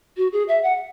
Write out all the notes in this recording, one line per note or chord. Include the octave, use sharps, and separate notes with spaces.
F#4
G#4
E5
F#5